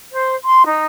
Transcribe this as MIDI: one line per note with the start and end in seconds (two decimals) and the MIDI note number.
0.11 0.34 72
0.45 0.65 84
0.65 0.86 63